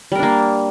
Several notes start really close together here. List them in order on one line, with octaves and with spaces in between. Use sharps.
G3 A#4 D4 A#3